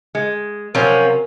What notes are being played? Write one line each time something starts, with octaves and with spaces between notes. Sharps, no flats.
G#3
C3 F3 F#3 C#4 A#4